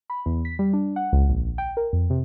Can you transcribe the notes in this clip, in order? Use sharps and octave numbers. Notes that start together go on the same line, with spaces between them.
B5
E2
B6
G3
D4
F#5
C#2
A#1
G5
A#4
F2
C3